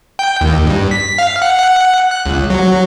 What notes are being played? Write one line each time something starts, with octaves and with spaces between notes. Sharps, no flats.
G5
D#2
G2
B6
F5
F#5
F#5
F#6
C#2
F#3